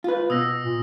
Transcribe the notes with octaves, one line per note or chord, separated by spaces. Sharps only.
F4 B4
B2 D#6 E6 A#6
A#2